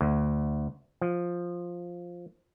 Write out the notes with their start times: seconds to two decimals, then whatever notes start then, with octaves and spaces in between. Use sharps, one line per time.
0.01 D2
1.01 F3